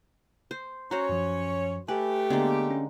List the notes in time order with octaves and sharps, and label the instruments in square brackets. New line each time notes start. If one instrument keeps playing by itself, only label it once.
[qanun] C5
[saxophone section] C#4 C#5 [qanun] F#4 C5 [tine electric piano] A#5
[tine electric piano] F#2 F3
[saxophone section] A3 G4 [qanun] B4 [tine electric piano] G#5
[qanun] D3 G#3 A#3 [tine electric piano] B3
[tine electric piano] C#4